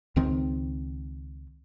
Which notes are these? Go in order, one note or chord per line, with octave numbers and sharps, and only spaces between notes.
C#2 D#3 C4